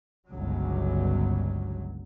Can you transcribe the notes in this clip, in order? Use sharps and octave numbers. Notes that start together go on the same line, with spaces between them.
G1 C#2 F#3